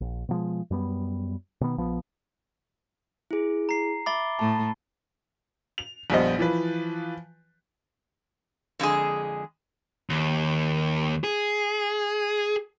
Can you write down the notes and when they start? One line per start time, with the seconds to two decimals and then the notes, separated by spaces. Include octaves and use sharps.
0.01 A#1
0.29 B2 F3 G#3
0.71 F#2 G3 B3
1.61 B2 D#3 B3
1.77 A#1 F3 B3
3.31 E4 G#4
3.69 A#5 C7
4.06 E5 B5 D6 A6 G7
4.39 A2 A3 A5
5.78 F7
6.10 A#1 F2 G3 B3 C5 D#5
6.39 E3 F3 B4
8.79 F2 D3 G#3 G#4
10.10 D#2
11.24 G#4